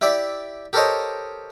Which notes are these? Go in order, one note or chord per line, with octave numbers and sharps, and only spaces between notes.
E4 G4 D5 E5
G4 A4 A#4 C5 C#5 D#5